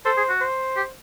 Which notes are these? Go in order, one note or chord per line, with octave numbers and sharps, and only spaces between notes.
A4 C5
G#4
F#4
C5
G4